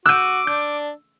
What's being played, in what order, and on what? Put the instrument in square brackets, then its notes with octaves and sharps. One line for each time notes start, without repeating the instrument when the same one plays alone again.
[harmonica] F#4 [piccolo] D6 [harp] E6 D#7 [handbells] F#6 G6
[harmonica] D4 [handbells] G6